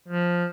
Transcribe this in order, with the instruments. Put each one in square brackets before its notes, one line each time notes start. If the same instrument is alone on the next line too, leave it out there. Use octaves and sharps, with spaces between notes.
[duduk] F3